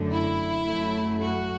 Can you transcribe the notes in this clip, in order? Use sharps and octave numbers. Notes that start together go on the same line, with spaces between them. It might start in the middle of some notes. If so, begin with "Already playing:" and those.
Already playing: F#2 D3 A3
E4
F#2 F#3 A3
F#4